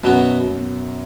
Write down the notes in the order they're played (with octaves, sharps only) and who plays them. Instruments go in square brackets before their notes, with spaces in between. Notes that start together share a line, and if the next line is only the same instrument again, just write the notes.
[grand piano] F#2 [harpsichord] B2 F#3 B3
[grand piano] B2